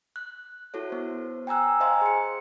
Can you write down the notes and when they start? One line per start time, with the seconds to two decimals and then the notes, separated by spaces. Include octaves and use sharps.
0.16 F#6
0.74 E4 F#4 A4 C#5
0.90 B3 C5
1.47 G5 G#5 A#5 E6 F#6
1.80 C5 D#5 F5 G#5 A#5 C6
2.01 G#4 C#7